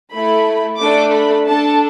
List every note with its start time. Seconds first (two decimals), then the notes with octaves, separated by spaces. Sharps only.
0.12 A3 E4 A4 B5
0.79 A3 D4 A4 D6
1.13 B5
1.47 D4 A4 A5